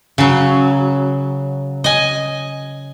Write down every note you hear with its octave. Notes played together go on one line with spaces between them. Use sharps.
C#3 F#3
D#5 G#5